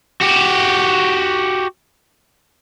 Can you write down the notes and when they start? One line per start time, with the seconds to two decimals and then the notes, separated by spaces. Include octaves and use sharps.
0.21 F#4 G4